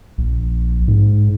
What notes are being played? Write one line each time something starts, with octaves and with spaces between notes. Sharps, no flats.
A#1
G#2